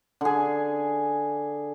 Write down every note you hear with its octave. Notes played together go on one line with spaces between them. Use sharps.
D3 G#4